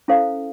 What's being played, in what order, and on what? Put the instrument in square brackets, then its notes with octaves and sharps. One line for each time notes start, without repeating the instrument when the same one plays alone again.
[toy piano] C#4 E4 A4 C5 F5